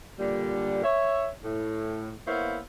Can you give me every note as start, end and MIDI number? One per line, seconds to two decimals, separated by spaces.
0.19 0.81 46
0.19 0.81 50
0.19 0.81 55
0.84 1.29 73
0.84 1.29 76
1.44 2.13 45
2.27 2.59 58
2.27 2.59 59
2.27 2.59 64
2.27 2.59 72
2.27 2.59 73
2.27 2.59 77